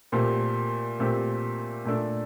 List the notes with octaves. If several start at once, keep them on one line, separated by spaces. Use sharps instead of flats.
A#2 A3 C4 G4
A#2 A3 C4 G4
A#2 A3 D4 A4